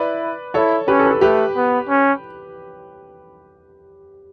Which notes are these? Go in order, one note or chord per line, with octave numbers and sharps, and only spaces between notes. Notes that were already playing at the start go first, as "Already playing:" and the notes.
Already playing: E4 B4 D5
E4 A4 C#5
C#4 G4 B4
A4
B4
A4
A3 G4 B4
B3
C#4